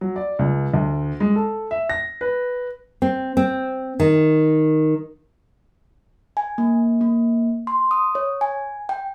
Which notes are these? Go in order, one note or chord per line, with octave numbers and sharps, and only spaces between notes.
F#3
D5
C#2
D2
G#3
A4
E5
A#6
B4
C4
C4
D#3
G#5
A#3
A#3
C6
D#6
C#5
G#5
G5